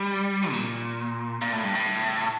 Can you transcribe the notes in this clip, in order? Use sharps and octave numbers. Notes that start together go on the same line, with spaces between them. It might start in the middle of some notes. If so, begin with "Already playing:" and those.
Already playing: G3
A#2
A#2
A2
G2
A2